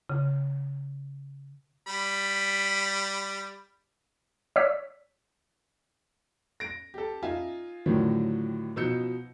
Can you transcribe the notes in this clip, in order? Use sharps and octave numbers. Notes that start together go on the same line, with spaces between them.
C#3
G3 B5
C#5 D5 E6 B6
A#6 D7
G4 A4
D#4 F4 E5 G#5
A2 D3 D#3 F3 F#3
B2 F3 D#4 E6 G6 C#7